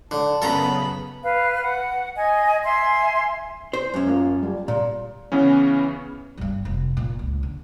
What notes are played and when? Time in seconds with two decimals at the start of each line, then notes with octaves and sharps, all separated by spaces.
0.11 D3 A5
0.42 F#2 C#3 B3 A4 A#5 B5
1.23 B4 F5
1.62 F#5
2.17 D#5 G#5
2.64 E5 G#5 C6
3.73 C5
3.94 F#2 C#4
4.07 A#3 F4
4.43 G3
4.68 A#2
5.32 C#3 E3 B3 C#4
6.37 G2 A#2
6.65 F1
6.97 A#2
7.19 C#2
7.43 D3